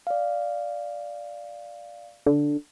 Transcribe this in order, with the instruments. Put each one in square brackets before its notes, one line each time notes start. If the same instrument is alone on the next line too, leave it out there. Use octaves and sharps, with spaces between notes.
[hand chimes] D5 F5
[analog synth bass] D3